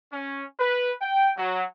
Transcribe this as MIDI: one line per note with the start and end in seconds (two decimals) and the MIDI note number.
0.12 0.44 61
0.58 0.92 71
1.01 1.29 79
1.37 1.63 54